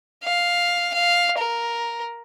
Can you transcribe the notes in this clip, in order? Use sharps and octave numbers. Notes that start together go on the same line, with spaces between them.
F5
F5
A#4